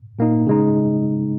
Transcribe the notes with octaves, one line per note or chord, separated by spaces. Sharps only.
A#2 A#3 D#4
C#3 G#3 D#4